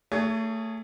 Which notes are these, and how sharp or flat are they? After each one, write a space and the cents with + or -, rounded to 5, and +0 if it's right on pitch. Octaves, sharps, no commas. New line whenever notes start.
A3 +25 G#4 +0 C#5 +30